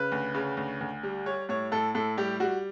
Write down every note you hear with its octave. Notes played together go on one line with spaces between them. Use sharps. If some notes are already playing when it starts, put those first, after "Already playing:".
Already playing: C#3 B4
D2
C#3
D2
D2
G3
G3 C#5
A2 C#5
A2 A4
A2 A4
G3 G4
G3 F#4